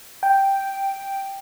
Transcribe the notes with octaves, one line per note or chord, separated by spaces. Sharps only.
G5